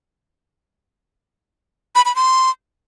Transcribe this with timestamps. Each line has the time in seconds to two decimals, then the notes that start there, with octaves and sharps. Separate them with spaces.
1.95 B5
2.06 B5
2.16 C6